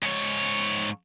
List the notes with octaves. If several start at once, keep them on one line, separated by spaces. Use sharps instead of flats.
G#2 C#5